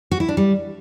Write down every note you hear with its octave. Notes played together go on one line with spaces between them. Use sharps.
F#4
E4
D4
G3